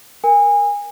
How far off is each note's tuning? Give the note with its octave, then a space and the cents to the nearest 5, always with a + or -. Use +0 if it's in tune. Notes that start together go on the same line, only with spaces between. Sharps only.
A#4 +0 G#5 -25